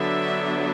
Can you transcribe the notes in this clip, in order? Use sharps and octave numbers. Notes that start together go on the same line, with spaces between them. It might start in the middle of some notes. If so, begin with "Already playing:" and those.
Already playing: D3 F#3 B3 D4 E5